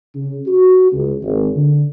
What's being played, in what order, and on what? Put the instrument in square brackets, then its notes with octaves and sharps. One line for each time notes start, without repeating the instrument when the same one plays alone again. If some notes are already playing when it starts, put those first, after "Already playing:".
[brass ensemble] C#3
F#4
C#2
G#1
D3